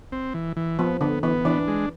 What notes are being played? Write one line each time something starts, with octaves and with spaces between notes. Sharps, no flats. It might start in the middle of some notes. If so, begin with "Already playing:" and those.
C4
E3
E3
F3 B3
D3 B3
E3 B3
E3 D4
G#3